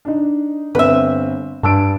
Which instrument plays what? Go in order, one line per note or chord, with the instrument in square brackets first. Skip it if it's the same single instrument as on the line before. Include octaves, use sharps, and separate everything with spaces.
[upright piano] D4 D#4
[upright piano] G1 C4 [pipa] B4 E5
[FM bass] G2 [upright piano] A5 E6 D7